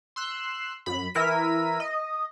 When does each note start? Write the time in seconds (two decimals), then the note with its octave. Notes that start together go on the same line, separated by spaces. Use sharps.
0.16 C6 E6 F#6
0.86 F#2 B5
1.14 E3 E4 A#4 B6 D#7
1.80 D#5